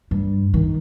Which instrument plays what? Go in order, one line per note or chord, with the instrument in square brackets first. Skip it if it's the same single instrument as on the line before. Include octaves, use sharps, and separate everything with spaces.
[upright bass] G2
D#3